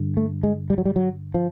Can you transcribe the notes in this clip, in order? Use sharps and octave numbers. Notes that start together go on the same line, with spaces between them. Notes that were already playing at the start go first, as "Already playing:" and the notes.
Already playing: G2 D3
A3
G#3
G3
F#3
G3
F#3
F3